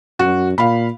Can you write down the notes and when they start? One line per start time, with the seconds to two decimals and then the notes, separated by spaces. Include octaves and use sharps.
0.19 F#2 F#4
0.58 A#2 F5 B5